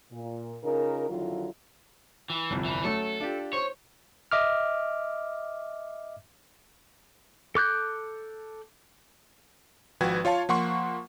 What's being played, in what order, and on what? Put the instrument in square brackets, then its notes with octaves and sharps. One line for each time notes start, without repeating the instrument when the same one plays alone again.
[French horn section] A#2
C#3 D#4 F4 A#4
F2 D3 D#3 F#3 E4 F4
[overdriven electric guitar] E3
[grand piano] G1 C2 F2
[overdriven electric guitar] E3
[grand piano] F#3 A3 C#4 [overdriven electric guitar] A4
[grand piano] D4 F4 G4
[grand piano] C5 C#6 [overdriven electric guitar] C#5
[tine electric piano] D#5 E5 D6 F6
[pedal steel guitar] A4 D6 F#6 G6
[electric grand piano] G#1 F3 F#4 B4 G5 G#6
F4 C#5 F5 A5
F3 A#3 F#5 C6 C#6